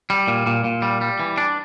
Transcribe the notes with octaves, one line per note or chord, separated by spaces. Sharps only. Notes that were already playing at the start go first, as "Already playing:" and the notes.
G3
A#2
A#2
A#2
G3
G3
E3
D4